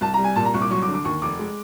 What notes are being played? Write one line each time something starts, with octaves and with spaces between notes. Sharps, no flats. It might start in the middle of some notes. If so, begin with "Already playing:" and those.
C2 A5
A#5
G3
G#5
A#2 A5
A#5
C2 C#6
D6
F#3 C#6
D6
D3
D6
D#2 C#6
F1 D6
G#3